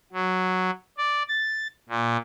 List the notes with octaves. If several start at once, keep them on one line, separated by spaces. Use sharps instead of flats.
F#3
D5
A6
A#2